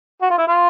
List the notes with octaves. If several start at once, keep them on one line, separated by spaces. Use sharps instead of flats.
F#4
F4
E4
F4